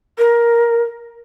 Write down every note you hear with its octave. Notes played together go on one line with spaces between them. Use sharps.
A#4